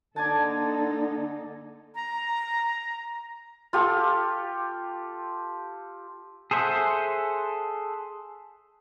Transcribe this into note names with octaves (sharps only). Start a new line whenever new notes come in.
D3 A#3 D#4 A4 D5 G#5 A5
A#5
F4 G4 A4
G#4 A4 C5 E5 F#5